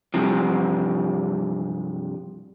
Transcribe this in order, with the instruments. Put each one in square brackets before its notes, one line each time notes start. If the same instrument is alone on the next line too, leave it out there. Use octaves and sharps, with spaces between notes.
[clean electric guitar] G2 C3 F3